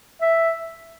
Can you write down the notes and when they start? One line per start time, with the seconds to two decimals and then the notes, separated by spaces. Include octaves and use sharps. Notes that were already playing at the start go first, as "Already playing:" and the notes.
0.22 E5